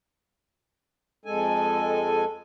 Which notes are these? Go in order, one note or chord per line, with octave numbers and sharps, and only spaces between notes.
F2 G#3 A4 G#5